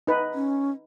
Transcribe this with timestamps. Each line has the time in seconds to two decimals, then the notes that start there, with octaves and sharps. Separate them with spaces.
0.07 D#4 B4
0.34 C#4